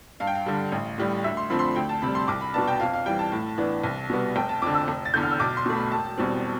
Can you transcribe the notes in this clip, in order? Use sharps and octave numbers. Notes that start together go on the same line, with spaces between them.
G2 F5
G5
F5
D3 G3
A1
A2 G3
D2 E5
C6
D3 F3 A3 C4 B5
C6
B5
D2 G5
A5
C3 G3 B5
C6
C2 D6
B5
B2 B3 D4 A5
G5
F2 F5
F5
E3 G3 G5
A5
A2
E3 B3 D4
C2
B2 G3 B3
F1 G5
A5
F2 D3 D6
E6
F1
A6
E2 D3 G6
F6
E6
B1 D6
C6
B2 A3
B5
E1 A5
E2 B2 G3 C4